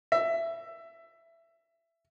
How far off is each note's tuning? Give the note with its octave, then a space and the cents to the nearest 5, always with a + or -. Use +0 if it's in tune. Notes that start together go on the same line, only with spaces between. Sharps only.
E5 +15